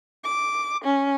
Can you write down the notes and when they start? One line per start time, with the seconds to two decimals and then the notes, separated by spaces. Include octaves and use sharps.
0.25 D6
0.84 C#4